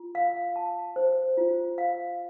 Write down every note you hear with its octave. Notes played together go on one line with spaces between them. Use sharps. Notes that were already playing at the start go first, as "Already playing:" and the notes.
Already playing: F4
F5
A5
C5
F4
F5